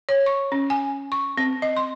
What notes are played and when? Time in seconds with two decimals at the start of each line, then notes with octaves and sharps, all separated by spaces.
0.09 C#5
0.26 C#6
0.52 C#4
0.70 G#5
1.12 C#6
1.37 C4
1.62 D#5
1.77 C6